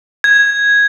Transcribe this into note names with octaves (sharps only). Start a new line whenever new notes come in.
G#6